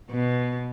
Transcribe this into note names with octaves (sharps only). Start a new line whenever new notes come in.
B2